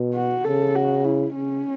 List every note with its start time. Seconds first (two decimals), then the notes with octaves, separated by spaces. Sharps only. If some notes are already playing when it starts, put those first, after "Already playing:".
Already playing: B2
0.15 F#4
0.44 C#3 A4
0.76 F#4
1.05 E4
1.35 C#3 C#4